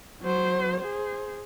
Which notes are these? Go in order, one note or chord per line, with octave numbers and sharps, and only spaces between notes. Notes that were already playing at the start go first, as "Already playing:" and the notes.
F#3 C5
G#4 C5